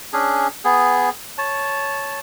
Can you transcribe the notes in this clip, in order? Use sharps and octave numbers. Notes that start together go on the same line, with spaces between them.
C#4 D4 G#4
B3 G#4
C#5 A5